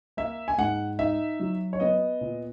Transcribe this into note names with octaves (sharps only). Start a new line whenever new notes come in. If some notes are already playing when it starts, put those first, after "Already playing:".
A#3 E5
G#5
G#2 F#5
D#4 E5
F#3
C#5
B3 D#5
A#2